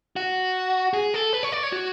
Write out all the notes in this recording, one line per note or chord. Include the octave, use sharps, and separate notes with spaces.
F#4
G#4
A4
B4
C#5
D5
C#5
F#4